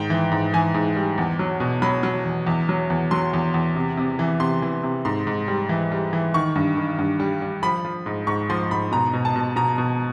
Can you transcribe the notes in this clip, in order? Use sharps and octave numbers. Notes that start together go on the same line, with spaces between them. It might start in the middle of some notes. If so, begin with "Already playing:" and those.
Already playing: G#2 D#3 G5
E3
G#2
E3 G#5
G#2
G3
E2
F#3
B2
F#3 B5
F#3
E2
E2
F#3
E2
F#3 C6
E2
E2
C3
C3
E3
C3 C6
E3
C3
G#2 C6
G#2
G3
E3
G3
E3
D#3 C#6
G2
D#3
G2
G3
G3
F3 B5
F3
G#2
G#2 C#6
F3 C6
G#2 B5
B2 A#5
B2
A5
B2
B2 A#5
B2